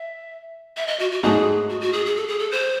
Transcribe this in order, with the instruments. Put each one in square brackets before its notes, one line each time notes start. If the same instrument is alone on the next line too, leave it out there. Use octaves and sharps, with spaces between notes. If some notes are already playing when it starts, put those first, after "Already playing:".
Already playing: [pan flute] E5
E5
D#5
F#4
F#4
[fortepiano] G#2 F#3 A3 D#4 [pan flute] G#4
[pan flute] F#4
F#4
G#4
G#4
A4
G#4
A4
C5